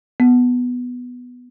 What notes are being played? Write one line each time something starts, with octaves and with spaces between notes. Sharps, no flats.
B3